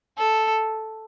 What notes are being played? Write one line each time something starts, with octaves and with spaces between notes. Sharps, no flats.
A4